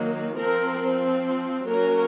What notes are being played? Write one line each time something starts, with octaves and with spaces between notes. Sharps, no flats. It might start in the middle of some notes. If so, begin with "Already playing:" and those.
Already playing: D#3 F#3 A#3
F3 C4 A#4
F#3 A#3 C#4 A#4